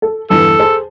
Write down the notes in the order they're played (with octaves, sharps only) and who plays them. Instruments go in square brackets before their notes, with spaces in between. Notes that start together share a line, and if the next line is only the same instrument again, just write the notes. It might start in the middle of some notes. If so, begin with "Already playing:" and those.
[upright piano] A4
[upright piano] E2 G2 D3 [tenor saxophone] A4
[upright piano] G#4 C5 A5